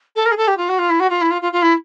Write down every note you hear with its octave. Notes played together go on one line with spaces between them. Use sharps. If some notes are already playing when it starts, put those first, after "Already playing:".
A4
A#4
G#4
A4
G4
F4
F#4
F4
E4
F#4
F4
E4
F4
F4
F4
E4